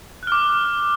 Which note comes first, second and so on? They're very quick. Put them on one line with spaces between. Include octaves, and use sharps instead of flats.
F#6 F6 D6